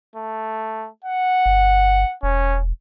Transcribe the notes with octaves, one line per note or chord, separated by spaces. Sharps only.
A3
F#5
G1
E1 C#4